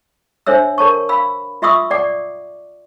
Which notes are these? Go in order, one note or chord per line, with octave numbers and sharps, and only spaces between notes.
D4 C5 C#5 E5 E6
A#4 C#5 A5 C#6
F5 B5 E6
F4 E5 C6 C#6 D#6 E6
D5 F#5 D6